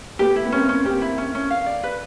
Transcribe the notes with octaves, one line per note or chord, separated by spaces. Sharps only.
A3 B3 G4
E4
B3
A#3 C4 C#4
C#4
A#3 C4 G4
E4
C#4
C#4
F5
D5
B4